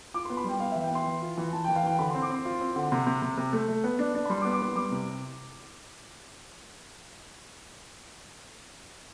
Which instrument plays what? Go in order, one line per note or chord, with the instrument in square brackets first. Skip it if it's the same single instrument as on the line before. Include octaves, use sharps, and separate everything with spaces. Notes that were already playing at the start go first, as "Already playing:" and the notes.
[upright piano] F4 [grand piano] D6
[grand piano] C6
[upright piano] B3
[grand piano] B5
[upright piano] G3 [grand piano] G5
[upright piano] B3 [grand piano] F5
[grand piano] E5
[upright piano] E3
[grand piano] G5
[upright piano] B3 [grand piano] C6
[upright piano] E3
F4
E3
[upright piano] E3 [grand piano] A5
[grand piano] G5
[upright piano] E3
[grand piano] F5
[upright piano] E3 [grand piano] G5
[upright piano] D3 [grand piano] B5
[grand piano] C6
[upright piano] C4
[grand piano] D6
[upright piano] C4 [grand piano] C6
[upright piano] F4
C4
D3
[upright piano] C3 [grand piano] C6
[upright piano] C3
C3
C3
A3
A3
B3
D4
D4
[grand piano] B5
[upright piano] G3 [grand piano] C6
[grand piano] D6
[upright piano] B3
[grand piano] D6
[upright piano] B3 [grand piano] C6
[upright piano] G3 [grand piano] D6
[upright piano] C3